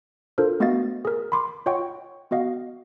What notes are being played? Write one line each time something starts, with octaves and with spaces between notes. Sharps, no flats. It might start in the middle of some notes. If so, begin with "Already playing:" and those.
D4 F4 A4 A#4 C5
A3 B3 F#4 D#5 F5 A6
G#4 A#4
B5 C6 D6
F4 C#5 D#5 F#5 G5 C#6
B3 F#4 D#5 F5 F#5